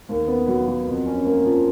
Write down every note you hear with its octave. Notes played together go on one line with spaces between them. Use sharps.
D#2
B3
F#3
F#3
F2
C#4
A#3
F3